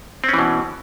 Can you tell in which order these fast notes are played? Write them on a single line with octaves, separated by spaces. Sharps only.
C4 C#4 E3 B2